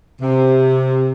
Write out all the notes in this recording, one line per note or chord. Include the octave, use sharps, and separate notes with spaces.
C3